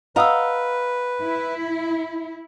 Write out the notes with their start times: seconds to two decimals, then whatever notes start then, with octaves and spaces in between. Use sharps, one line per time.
0.16 B4 D#5 F5 F#5 A#5 D#6 E6
1.22 E4